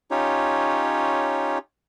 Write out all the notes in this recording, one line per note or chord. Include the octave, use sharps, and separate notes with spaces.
C#4 D#4 F4 G4 C#5